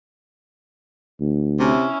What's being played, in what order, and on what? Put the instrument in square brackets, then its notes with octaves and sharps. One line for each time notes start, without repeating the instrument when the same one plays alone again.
[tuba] D2
[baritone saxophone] C3 [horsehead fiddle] C#4 E4